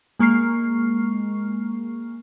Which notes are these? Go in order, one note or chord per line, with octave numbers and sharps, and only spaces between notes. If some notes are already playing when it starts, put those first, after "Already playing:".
G#3 A#3 C#6 F6 C7